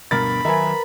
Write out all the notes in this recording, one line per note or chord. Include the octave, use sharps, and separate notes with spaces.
D2 G2 B2 A#4 B5 A6
D#3 F#3 A#4 B4 E5 G#5